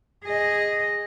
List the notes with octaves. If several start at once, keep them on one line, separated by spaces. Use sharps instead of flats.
G#4 D#5